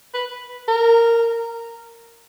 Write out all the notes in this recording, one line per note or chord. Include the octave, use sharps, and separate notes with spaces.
B4
A#4